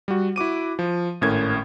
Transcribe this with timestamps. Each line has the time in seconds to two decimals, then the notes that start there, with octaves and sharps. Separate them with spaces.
0.08 G3 F#4
0.36 E4 F#4 D6 D#7
0.79 F3
1.21 G#1 A2 C#4 A#4 G#6